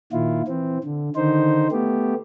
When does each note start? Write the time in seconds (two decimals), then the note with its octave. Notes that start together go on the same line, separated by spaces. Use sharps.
0.13 A#2 D#3 E4 F4
0.48 E3 C4
0.84 D3
1.16 D3 D#3 D#4 C5
1.71 A3 B3 G4